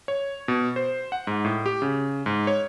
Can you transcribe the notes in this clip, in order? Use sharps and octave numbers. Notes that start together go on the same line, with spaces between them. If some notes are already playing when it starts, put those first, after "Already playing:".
C#5
B2
C5
F#5
G#2
A2
G4
C#3
G#2
C#5